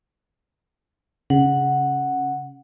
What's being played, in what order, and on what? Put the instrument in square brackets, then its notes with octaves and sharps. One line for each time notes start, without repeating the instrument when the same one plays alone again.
[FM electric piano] C#3 [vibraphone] F#5